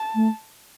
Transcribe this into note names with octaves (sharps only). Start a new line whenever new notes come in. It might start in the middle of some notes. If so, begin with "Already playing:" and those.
Already playing: A5
A3